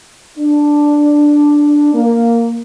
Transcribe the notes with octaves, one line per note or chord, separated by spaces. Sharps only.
D4
A#3